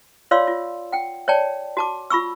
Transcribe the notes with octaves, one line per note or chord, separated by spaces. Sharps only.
F4 C#5 D5 F5 C6 E6
F4
F#5 G5
C#5 D5 G5 A5
F#4 A5 D6
F4 B5 C#6 E6